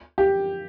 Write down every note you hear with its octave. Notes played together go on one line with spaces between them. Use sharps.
G4